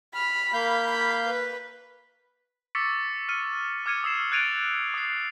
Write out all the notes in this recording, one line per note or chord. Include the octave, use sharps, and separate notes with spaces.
B5 F6
A#3 F5 G6
B5
B4
C#6 D6 E6 A6 B6 C#7
F6 C#7 D#7
D6 F6 G#6 C#7 D#7
D#6 E6 C7 E7
F#6 G#6 A6 D7 D#7 F7
D#6 C7